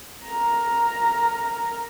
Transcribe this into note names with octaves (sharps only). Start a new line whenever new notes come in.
A#4 A#5